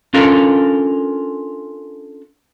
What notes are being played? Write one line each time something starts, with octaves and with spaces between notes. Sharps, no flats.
C#4 D4 F4 A4 A#4